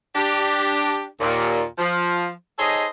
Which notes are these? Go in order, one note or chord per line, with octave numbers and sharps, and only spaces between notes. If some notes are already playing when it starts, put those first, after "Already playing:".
D4 G4
D#2 A#2
F3
D#4 G#4 A4 C5 C#5 D#5